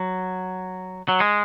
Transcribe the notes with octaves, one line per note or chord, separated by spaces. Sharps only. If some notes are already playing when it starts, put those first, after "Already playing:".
Already playing: F#3
F#3
G#3